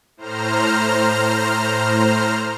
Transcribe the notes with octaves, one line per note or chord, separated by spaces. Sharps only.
A2 C5 A#5 F6